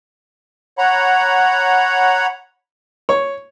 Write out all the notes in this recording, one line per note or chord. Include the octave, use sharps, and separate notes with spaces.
C#5 F#5 A#5 B5
C#5